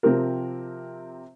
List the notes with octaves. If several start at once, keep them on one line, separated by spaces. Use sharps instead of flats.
C3 F3 C4 G4 A#4